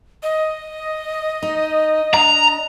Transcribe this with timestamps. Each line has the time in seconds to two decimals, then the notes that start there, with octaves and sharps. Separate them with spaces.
0.23 D#5
1.43 D#4
2.13 D4 A#5